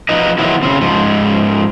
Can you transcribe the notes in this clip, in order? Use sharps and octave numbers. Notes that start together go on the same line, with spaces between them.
F3 D#4 B4 D#5
D#3 F3 F#3 B3 E4
C#3 C4
G#2 F3